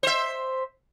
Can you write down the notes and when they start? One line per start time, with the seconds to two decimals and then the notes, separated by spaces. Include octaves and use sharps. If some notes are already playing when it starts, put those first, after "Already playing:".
0.03 C5 E5